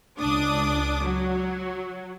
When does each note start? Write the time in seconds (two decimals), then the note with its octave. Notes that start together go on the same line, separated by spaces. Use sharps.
0.19 C#2 D4 D6 D#6
1.04 F#3